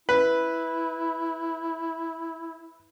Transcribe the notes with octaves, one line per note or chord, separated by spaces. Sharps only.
E4 B4